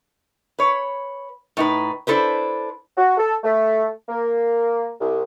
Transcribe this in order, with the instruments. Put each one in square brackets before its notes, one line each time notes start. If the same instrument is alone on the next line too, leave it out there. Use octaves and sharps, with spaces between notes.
[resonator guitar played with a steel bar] B4 C#5
A2 D#4 B4
D4 E4 A4 B4 C5
[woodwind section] F#4
A4
A3
A#3
C2